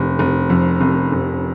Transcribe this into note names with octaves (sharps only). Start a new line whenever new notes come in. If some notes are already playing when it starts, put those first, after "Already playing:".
Already playing: F1
F1
F2
F1
F1